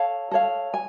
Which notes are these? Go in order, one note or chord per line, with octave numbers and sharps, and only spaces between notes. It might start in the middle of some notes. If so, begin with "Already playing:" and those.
Already playing: A4 C#5 F5
A4 C#5 F5
G#5